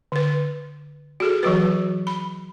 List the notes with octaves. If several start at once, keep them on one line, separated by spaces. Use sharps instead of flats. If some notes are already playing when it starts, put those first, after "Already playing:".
D3 B4
F#4 G#4 A4
E3 F#3 F#4 B4
B5